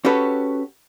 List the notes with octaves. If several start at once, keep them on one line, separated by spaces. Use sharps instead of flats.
C#4 F#4 G4 A4 B4 C#5